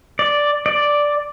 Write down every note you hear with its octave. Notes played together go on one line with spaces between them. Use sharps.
D5
D5